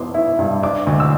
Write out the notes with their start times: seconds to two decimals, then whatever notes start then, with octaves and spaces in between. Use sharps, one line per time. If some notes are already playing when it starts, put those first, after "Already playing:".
Already playing: E3 B3 C6 D6
0.14 E4
0.39 G2
0.62 D4 D6
0.87 D2
1.00 E6